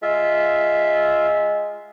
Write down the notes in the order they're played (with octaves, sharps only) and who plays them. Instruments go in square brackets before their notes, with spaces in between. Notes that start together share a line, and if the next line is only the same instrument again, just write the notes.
[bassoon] G#3 [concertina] F4 E5